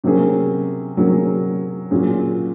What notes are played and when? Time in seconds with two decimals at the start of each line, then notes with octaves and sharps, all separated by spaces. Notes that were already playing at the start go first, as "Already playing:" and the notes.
0.04 C3 F#3 A#3 C#4 G#4
0.97 C3 F#3 A#3 C#4 G#4
1.91 A#2 F#3 C#4 G#4